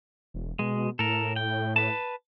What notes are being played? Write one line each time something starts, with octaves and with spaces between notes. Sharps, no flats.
E1
B2 G#3
A2 A4 A#4
G5
B4 A5